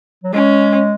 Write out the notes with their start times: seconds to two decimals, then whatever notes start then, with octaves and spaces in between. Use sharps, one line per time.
0.24 F#3
0.33 G#3 C#4